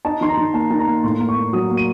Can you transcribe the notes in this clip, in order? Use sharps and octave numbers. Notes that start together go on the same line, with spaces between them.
D#4 A5
D#3 C6
A#5
D#3
A#3 A5
D#3 A5
A#5
A#3
A2 C6
A#3
C#6
A#3
F#3 D#6
A#3
D#7